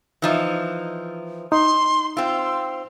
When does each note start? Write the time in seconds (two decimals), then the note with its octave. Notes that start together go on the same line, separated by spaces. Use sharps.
0.22 E3 F3 D#4
1.52 D#4 C6
2.17 C4 F4 E6